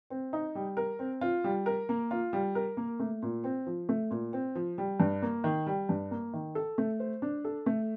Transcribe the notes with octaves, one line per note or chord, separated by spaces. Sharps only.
C4
D#4
G3
A#4
C4
F4
G3
A#4
A#3
F4
G3
A#4
A#3
A3
A#2
C4
F3
A3
A#2
C4
F3
G3
G2
A#3
D#3
G3
G2
A#3
D#3
A4
A3
C5
D4
A4
A3